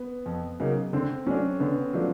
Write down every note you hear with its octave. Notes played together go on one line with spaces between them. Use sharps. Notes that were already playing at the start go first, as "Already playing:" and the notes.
Already playing: B3
F2
C#3 F#3 A#3 D#4
D3 C4
F#3 A3 C#4 D4
D3 B3
F3 F#3 A3 D4